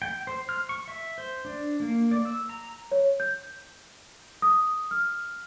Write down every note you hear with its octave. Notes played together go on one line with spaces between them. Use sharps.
G5
C5
F6
C#6
E5
C5
D4
A#3
D5
E6
A#5
C#5
G6
D#6
F6